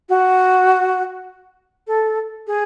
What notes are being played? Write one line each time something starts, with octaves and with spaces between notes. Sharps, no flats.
F#4
A4
G#4